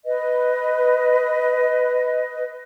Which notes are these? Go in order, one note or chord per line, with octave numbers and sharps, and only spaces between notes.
B4 D#5